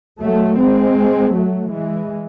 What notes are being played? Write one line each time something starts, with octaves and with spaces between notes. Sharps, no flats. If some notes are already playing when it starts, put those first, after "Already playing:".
F#3 A3
G#3 C4
F#3 A3
E3 G#3